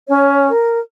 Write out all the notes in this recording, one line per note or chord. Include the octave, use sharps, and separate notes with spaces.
C#4 C#5
A#4